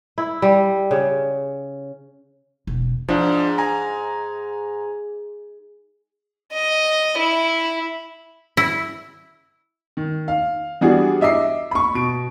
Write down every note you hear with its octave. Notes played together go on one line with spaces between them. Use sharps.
E4
G3
C#3
E1
G#2 F3 D4
G#5 A#5
D#5
E4
E4
D#3
F5
E3 G3 B3 D4 F#4 G#4
D#5 E5 D6 C7
B5 C#6
B2 D7